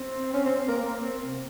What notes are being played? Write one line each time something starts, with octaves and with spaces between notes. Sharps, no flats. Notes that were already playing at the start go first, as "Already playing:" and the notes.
Already playing: C4
C#4
C4
C4
A#3
A#3
C4
C3